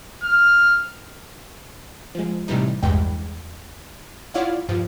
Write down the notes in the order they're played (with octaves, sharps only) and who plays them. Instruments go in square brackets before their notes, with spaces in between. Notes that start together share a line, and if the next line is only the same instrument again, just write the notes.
[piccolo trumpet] F6
[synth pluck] F3 G#3
A2 C3 E3 G3 D#4
A1 E2 G2 G#3 G5
E4 F4 C#5 D5 F5 F#5
G2 F3